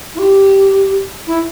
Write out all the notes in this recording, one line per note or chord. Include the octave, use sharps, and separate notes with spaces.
E4
G4
E4